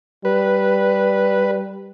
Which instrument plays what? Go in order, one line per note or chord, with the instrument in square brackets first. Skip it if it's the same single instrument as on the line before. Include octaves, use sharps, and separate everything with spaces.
[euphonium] G3 [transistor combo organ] B4